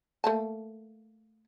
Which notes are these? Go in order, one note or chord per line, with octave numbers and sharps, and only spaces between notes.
A3 A#3 A5